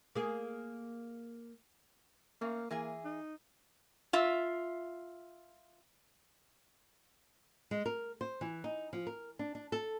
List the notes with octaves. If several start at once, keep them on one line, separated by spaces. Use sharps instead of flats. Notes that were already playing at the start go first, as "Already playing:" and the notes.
A#3 G#4
A3 A#3 C#4
E3 A#3 G#4 G#5
D#4
F4 E5
G#3
A#4
C5
E3
D#4
F3
A#4
D4
D4
A4